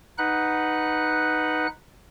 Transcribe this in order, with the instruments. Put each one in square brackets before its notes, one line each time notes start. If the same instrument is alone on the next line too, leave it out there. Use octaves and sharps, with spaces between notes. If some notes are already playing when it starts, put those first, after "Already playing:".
[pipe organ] D#4 B4 F#5 F#6